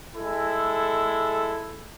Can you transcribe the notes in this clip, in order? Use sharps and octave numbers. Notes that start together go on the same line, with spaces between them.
G#3 E4 A4